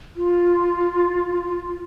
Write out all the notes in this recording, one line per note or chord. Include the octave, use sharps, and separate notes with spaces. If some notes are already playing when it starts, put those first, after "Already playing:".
F4